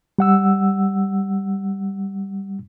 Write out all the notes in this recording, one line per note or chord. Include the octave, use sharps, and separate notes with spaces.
G3 F#5 E6